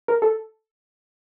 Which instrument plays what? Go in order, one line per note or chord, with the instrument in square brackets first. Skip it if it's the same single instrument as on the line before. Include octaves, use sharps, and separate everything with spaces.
[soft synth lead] A#4
A4